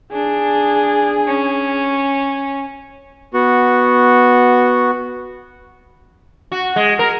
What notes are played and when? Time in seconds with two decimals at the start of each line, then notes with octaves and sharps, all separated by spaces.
0.13 D4 G#4
1.27 C#4
3.34 B3 F#4
6.52 F#4
6.76 G#3
6.99 A#4